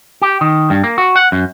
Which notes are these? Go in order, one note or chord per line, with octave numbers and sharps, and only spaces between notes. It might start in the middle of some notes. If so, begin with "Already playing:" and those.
G4
D#3
G2
A#3
F#4
F#5
F#2